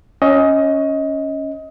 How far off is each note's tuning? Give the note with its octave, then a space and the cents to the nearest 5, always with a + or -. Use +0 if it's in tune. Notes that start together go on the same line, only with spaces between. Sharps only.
C#4 +0 D#5 +20